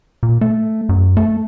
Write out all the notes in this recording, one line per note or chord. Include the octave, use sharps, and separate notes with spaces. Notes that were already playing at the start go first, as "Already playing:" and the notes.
A#2
A3
F#2
A3